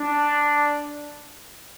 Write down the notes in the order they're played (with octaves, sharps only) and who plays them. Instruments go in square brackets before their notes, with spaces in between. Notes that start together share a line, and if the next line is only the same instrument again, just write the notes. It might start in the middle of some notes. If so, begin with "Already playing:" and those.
Already playing: [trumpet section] D4